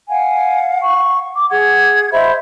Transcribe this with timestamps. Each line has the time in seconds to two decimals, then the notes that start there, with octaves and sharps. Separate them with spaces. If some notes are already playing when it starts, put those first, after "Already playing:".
0.08 F5 F#5 G#5
0.83 C#6
1.36 D6
1.50 G#4 F#5 G#6
2.12 C5 D#5 E5 B5